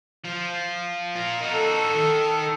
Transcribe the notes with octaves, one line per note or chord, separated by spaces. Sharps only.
F3
F4 A#4
D#4 F#4 A#4
A4
D#3